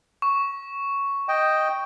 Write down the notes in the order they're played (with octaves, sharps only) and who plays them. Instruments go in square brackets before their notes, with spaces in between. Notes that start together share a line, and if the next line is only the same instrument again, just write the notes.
[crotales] C#6
[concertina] D#5 G5